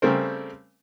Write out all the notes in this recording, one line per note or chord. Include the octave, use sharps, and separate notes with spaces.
C#3 G3 A3 C4 A#4 C5